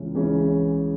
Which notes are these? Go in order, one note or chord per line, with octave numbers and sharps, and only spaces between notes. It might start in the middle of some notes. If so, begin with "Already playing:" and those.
Already playing: C#2 C#3 E3 C#4
C#2 C#3 E3 C#4